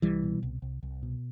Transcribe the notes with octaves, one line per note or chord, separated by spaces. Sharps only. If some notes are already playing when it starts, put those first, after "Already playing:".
C2 E3 G3
B2
C2
C2
C2
B2